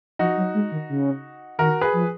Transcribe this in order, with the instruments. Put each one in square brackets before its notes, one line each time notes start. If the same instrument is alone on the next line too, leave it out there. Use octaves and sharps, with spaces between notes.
[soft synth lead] F3 [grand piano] D#4 F#4
[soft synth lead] F#3
G#3
D#3
C#3
[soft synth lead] D#3 [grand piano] F#4 A#4
[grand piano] G#4 B4
[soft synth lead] F3